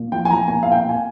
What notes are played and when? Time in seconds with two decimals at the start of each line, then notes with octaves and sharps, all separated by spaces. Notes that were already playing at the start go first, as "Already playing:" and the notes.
Already playing: A#2
0.12 F3 G5
0.25 G#5
0.30 F3 A#5
0.48 A#2 G#5
0.63 A#2 F5
0.72 G5
0.76 F5
0.85 A#2 G#5